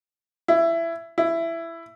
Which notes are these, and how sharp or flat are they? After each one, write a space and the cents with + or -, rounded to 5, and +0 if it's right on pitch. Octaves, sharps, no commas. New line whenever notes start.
E4 +20
E4 +15